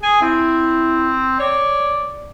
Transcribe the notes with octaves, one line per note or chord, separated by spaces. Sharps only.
G#4 G#5
C4 E4
C#5 D5